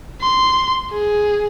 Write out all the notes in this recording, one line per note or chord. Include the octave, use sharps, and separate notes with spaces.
C6
G#4